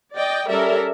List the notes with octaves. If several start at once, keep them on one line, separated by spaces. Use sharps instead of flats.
D5 D#5 G5
G3 C#4 A4 A#4 D5 E5